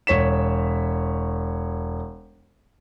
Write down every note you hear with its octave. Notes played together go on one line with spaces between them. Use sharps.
E1 C#5 B6 E7